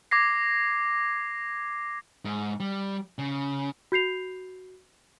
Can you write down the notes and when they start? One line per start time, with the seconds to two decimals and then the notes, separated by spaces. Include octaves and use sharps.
0.11 D6 G#6 A#6 C7
2.25 G#2
2.60 G3
3.19 C#3
3.92 F#4 G6 C7 F7